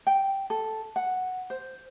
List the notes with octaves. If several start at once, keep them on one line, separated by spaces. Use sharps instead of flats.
G5
A4
F#5
C5